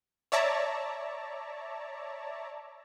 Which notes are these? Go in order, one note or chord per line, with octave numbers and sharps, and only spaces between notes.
C#5 D5 E5 A5 A#5